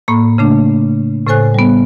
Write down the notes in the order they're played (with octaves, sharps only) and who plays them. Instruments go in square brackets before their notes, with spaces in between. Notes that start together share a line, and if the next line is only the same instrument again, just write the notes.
[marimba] A2 A#3 B5
C#3 A3 D4
A2 C#3 A4 C5 G#5 F#6
G3 B3